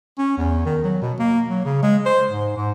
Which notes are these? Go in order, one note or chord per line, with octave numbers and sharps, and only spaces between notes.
C#4
E2
D#3
F#3
B2
A#3
F#3
C#3
G#3
C5
G#2
G#2